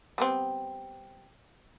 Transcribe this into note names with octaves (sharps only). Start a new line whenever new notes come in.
G3 B3 C4